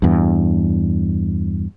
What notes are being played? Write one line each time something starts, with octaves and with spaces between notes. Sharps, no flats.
E2 G2